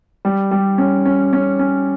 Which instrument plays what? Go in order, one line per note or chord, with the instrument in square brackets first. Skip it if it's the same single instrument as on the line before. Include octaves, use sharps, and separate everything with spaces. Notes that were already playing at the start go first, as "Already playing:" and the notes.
[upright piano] G3
G3
C#4
C#4
C#4
C#4